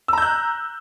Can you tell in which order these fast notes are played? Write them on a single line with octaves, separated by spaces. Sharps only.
E6 A#5 G6 F#6